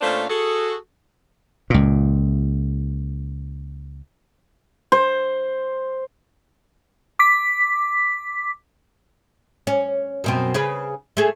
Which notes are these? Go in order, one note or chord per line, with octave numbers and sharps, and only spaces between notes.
A#2 A3 C#4 D4 C5 F5
F#4 G#4 A4
C#2 A#2
C5
D6 B6
C#4
F#2 B2 C4
C#3 G#4 B4
A3 G#4